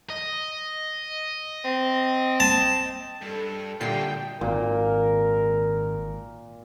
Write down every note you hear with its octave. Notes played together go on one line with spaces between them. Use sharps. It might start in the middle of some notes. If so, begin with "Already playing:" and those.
D#5
C4
A5
G2 A4
A#2 D3 G3 A3 D#4 G5 C7
G#1 A#2 A#4